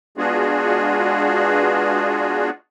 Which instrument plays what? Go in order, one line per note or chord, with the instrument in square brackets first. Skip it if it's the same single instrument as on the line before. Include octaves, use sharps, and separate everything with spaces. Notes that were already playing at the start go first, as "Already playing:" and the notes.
[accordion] G#3 B3 D4 F4 F#4 G#4